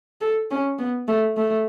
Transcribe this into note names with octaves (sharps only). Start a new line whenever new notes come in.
A4
C#4
B3
A3
A3